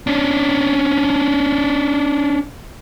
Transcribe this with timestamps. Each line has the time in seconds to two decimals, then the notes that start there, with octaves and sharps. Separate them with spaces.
0.07 C#4 D4